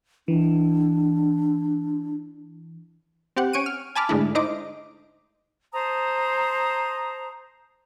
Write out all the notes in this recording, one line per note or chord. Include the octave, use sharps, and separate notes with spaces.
E3 D4
C4 G4 F#5
C#4 C#6 D7 D#7
F6
G#5 A5 B5 D6 F6
G#2 D3 G#3 A3 D4 E4
D#4 E4 C5 D#5 D6
C5 A5 A#5 D#6